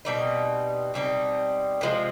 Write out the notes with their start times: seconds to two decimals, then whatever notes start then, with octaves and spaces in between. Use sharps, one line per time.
0.05 B2 G3 C4 D#4
0.94 B2 G3 C4 D#4
1.81 C3 F3 G#3